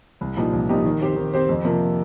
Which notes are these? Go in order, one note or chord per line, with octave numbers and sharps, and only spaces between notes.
C2
A#2 F3 D#4 G4
C2
A#2 F3 D#4 G4
D#3
C4 G4 C5
D#3
C4 G4 C5
F2
C3 F3 A#3